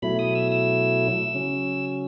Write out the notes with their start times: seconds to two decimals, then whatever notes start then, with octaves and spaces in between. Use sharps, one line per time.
0.02 B2 F#3 A3 E4 B5
0.19 D#6
0.35 E6
0.52 E6
1.34 C#3 F#3 C#4